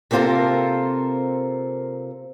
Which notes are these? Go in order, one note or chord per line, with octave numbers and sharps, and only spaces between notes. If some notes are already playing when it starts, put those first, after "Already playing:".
C3 A#3 C4 F4 A4 A#4